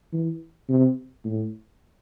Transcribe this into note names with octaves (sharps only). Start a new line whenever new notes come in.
E3
C3
A2